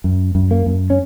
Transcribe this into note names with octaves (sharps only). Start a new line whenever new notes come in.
F#2
F#2
A#3
F#2
C#4